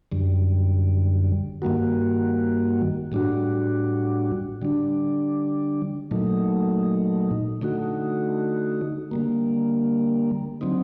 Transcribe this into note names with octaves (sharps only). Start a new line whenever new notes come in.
F#2 D3 G3
G2 D#3 G3 A#3 F#4
A2 G3 D4 F#4
D3 G3 D4
A#2 F#3 A3 D#4
D3 A3 D#4 F#4
D3 G3 A#3
D3 F#3 C4 D#4